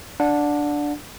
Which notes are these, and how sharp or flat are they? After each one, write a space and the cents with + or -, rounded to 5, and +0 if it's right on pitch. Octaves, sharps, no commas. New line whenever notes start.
D4 +0 F#5 -25